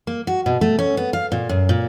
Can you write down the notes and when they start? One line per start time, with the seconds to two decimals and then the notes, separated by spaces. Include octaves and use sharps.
0.07 A#3
0.27 F#4
0.46 B2
0.61 A3
0.79 C#4
0.97 B3
1.13 F5
1.32 A#2
1.49 F#2
1.69 A#2